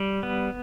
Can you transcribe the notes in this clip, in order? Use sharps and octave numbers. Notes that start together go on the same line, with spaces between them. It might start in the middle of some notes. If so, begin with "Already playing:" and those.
Already playing: G3
B3